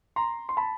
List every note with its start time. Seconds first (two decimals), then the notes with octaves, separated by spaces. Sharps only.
0.16 A#5 C6
0.49 C6
0.57 A5 B5